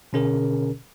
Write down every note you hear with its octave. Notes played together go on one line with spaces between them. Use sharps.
B2 D3 C#4 G#4 A#4